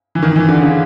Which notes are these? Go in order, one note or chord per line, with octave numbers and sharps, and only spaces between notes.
E3
D#3
E3
D3
C#3